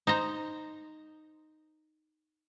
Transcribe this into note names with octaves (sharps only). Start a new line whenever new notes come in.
D#4 C5 A#5